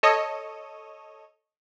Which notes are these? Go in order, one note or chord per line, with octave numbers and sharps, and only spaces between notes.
A4 C#5 D#5